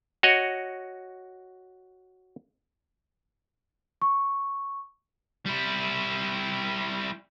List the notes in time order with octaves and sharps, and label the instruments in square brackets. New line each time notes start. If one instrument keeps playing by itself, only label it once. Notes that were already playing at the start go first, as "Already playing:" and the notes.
[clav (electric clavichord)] F#4 C#5 D#5
[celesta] C#6
[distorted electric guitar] G3 E4